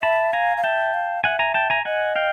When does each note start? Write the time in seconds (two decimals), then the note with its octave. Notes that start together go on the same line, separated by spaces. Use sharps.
0.03 E5 A5 B5
0.33 F5 G#5 A#5
0.57 F5
0.64 E5 G5 A5
0.94 F5
1.24 E5 F#5 G#5
1.39 G#5 A#5
1.54 G5 A5
1.70 G#5 A#5
1.85 D#5 F#5 G#5
2.16 F5 G5